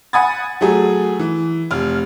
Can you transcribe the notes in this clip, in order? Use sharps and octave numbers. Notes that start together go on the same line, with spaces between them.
F#5 G#5 B5 D#6 G#6 A6
F#3 A3 G#4
E3
F1 F6